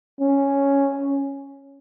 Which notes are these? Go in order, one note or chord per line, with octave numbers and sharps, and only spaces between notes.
C#4